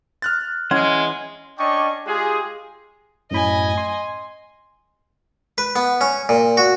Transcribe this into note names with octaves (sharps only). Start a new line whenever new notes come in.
F6 F#6 A6
E3 G#3 C#4 F#5 C6 G#6
C#4 D4 D5 D#5 G5 C#6
G#3 F4 G4 G#4
F#2 A2 D#5 G#5 B5
C6
B4
B3
C#4
A#2
F#4